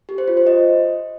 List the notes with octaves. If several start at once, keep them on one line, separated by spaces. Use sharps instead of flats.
G4
C5
F4
C5
D#5